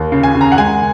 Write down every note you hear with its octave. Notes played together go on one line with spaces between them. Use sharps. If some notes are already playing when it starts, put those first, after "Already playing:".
Already playing: D#2
C#3
G#5
C#3
A#5
F#5
G#3 G#5